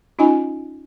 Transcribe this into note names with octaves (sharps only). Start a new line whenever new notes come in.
C#4 D#4 F4 D#5 G#5 B5